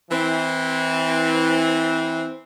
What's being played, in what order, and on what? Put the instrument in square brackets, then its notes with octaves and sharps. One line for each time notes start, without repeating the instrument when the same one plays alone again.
[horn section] E3 C4